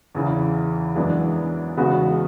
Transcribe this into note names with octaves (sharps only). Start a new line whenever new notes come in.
E2 C#3 E3
F#2 E3 G#3 B3 D4
E2 C#3 G#3 B3 F#4